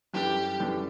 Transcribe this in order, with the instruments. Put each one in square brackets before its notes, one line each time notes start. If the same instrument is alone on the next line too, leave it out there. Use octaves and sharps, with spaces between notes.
[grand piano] F#2 E3 G3 D4 A4 [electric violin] G4
[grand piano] F#2 E3 G3 D4 A4